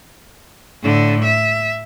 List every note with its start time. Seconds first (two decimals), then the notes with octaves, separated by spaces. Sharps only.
0.83 A2 D3
1.24 E5